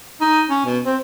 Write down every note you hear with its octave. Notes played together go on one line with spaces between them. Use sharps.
D#4
C#4
B2
C4